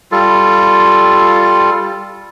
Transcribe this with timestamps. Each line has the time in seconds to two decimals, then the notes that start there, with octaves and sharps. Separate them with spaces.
0.12 G3 F4 A4